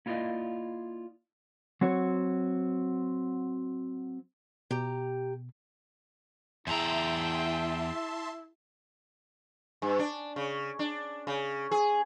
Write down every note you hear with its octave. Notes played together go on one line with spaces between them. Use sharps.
A#3 E4 F4 D5 D#5
F#3 C4 F#4 C#5
B2 G4 A#5
E2 E4 G#4 E5 G5 A5 A#5 C6
G2
D4
C#3
D4
C#3
G#4